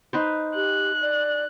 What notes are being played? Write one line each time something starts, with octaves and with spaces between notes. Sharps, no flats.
D#4 B4 C5
G4 F#6
D5